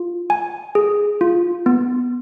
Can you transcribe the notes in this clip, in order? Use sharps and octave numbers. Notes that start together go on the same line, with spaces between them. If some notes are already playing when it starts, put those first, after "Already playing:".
Already playing: F4
G#5
G#4
F4
B3